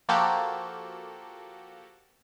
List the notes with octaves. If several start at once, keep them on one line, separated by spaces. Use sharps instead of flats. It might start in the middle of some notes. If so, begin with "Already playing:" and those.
F3 A#3 F#4 G4 A4